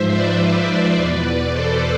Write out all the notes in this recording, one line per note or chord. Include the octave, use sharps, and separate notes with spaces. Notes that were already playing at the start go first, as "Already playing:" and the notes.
Already playing: G#2 F3 C5 E5
B4 D5
B4 D5
E2 B2 B4 D5
A4 C5